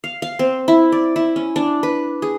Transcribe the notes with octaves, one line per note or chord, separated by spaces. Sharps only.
F5
F5
C4
E4
D5
E4
C#4
D4
B4
G#4